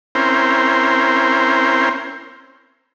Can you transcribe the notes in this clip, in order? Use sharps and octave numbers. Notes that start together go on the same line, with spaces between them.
C4 C#4 E4 A#4 C5